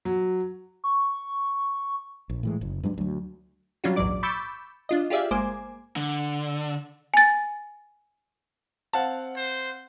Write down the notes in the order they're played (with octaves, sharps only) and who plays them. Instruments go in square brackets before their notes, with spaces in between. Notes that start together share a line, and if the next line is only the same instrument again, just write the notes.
[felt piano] F#3
[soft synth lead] C#6
[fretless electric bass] A#1
A2 E3 G#3
F#1
G2 F#3 G#3 D4
D2 F#3
[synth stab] F#3 G3 C#4 D4 F4 F#4
A#1 E2 G#2 F#3 D5 D6
B5 C#6 D6 E6 G6 A6
D4 F4 D#5
F4 G4 G#4 D5 E5 F5
G1 G#3 A#3 C5 G#5 D6
[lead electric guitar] D3
[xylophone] G#5 A6
[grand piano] C4 F5 F#5 [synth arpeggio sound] A5
[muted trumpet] C5